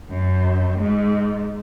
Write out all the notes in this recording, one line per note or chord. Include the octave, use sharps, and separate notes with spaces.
F#2
G#2